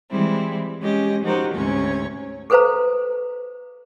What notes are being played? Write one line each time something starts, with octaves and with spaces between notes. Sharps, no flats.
E3 G3 G#3 C4 E4
G#3 C#4 G4 D#5
F3 D#4 F#4 G4 A#4 C5
D2 G#2 C3 C#4 C#5
G#4 A4 B4 C5 F5 A#5